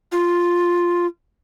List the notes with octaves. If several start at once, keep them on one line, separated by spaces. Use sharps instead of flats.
F4